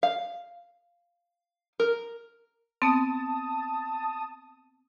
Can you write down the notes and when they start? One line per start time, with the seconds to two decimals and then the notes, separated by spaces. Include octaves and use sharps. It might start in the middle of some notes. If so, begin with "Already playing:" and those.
0.03 F5
1.80 A#4
2.82 B3 C4 A5 D#6